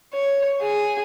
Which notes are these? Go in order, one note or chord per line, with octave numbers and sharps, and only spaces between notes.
C#5
G#4